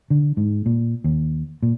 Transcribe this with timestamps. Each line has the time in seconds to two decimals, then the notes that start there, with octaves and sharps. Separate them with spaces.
0.10 D3
0.37 G#2
0.66 A#2
1.04 D#2
1.63 A#2